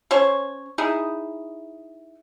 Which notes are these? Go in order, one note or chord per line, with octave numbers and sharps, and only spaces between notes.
C#4 C5 C#5
D#4 E4 G#4